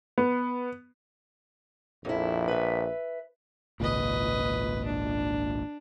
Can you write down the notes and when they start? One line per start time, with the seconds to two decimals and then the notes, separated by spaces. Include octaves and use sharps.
0.18 B3
2.05 A#1 F2 E4
2.48 B4 E5
3.80 G#1 C#2 A#2 B4 D#5
4.85 D4